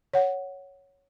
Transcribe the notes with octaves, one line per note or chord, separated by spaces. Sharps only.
C#5 F#5